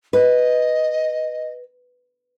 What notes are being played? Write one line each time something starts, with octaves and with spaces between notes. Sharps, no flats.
B4 D#5